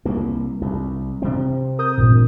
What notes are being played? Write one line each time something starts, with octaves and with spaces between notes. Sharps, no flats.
C2 A#3
C2
C3 C4
A#4 D#6 G6
A1 G2 A#2